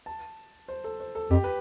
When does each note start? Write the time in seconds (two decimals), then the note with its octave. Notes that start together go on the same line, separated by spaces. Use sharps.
0.06 A5
0.68 C5
0.84 A4
1.00 C5
1.15 A4
1.31 F2 G4
1.44 B4